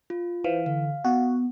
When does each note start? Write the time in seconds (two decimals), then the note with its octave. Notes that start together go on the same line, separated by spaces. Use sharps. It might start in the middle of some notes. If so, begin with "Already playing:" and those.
0.10 F4
0.44 E3 C5 F5
0.66 D3 F5
1.05 B3 F#4